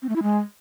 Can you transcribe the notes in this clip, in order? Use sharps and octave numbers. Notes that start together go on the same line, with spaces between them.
C4
A3
E4
G#3